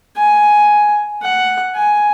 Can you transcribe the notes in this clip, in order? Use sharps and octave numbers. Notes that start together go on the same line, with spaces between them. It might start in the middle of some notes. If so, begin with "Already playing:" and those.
G#5
F#5
G#5